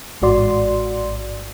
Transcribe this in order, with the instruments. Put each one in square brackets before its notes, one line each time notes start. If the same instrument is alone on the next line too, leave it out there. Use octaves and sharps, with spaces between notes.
[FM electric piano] A1 G#2 F#4 D5 C6